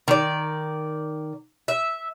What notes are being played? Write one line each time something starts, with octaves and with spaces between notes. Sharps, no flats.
D#3 D5
E5